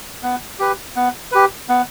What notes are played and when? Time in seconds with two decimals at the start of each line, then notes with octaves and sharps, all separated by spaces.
0.23 B3
0.59 G4 B4
0.96 B3
1.32 G4 B4
1.69 B3